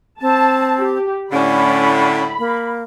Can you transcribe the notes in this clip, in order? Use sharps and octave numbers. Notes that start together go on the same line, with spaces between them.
C4 A5
G4
A2 D3 C#4 B5
A#3